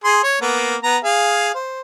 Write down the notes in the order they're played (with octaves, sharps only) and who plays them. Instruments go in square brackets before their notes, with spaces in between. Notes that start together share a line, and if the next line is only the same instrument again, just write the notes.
[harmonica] G#4 C6
C#5
A#3 B3
B3 A#5
G#4 F5
C5